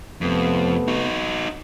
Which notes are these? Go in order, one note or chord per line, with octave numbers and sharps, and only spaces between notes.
F2 C3 A3 B3
D#4 F#4